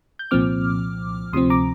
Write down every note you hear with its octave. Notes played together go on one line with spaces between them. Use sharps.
G6
C2 A#2 F3 C4 D6 F6
D2 C3 F3 C4 C6 D#6
A#5 D6